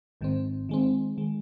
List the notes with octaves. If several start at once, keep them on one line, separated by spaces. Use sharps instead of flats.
G#1 G#2 D#3 C4
D#3 G#3 C4
D#3 G#3